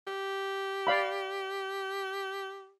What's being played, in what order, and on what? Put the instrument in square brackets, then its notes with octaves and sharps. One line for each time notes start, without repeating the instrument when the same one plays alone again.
[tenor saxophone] G4
[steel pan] D5 F5 B5